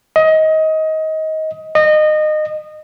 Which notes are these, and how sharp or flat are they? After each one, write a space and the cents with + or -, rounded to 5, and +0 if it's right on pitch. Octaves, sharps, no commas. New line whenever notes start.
D#5 +20
D#5 -25